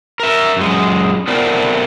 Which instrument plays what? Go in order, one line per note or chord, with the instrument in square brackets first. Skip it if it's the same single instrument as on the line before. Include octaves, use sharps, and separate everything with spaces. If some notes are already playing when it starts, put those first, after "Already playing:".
[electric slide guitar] A#4 E5
F#2 G#3
A3 B3 C4 A#4 D5